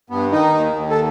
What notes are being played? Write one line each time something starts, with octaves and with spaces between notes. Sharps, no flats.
G2 B3
D#3 D#4
D#2
D#2
A4